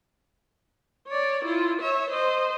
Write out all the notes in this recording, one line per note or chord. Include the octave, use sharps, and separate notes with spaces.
C#5 D5
E4 F4
C#5 E5
C5 D#5